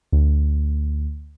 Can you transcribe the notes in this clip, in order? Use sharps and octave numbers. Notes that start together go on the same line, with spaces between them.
D2